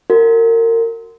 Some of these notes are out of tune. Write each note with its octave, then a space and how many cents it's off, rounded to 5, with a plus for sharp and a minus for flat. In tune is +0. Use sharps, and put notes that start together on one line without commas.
F#4 +0 A#4 -30